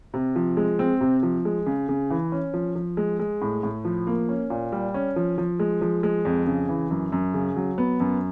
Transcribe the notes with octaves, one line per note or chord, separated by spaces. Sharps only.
C3
F3
G#3
C4
C3
F3
G#3
C#3
C#3
E3
C#4
F3
F3
G#3
G#3
A2
A2
F3
A#3
C#4
A#2
G3
C#4
F3
F3
G#3
F3
G#3
F2
C#3
E3
F#2
F#2
C#3
F#3
B3
F#2